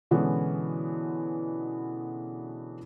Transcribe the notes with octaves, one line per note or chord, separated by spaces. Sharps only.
B2 D3 E3 G#3 B3 C#4